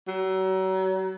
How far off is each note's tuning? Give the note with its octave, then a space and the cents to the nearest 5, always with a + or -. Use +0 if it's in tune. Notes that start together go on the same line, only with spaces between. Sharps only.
F#3 +35